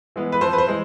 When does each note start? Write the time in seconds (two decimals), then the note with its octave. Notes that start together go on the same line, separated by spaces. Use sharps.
0.16 E3 G#3 B3
0.32 B4
0.41 F2 C5
0.53 B4
0.58 C5
0.67 E3 G#3